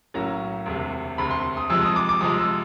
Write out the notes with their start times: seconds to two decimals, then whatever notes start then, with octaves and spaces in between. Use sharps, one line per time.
0.14 B1 A2 F#3 A#3 C#4 A#5
0.66 E1 D2 C3
1.18 E1 D2 C3 B5
1.31 C6
1.57 D#6
1.70 F2 C3 F3 G#3 E6
1.82 D#6
1.96 D6
2.09 D6
2.21 F2 C3 F3 G#3 D#6
2.38 E6